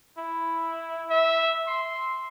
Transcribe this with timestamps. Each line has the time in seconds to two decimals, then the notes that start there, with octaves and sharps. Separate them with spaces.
0.18 E4
1.10 E5
1.67 C6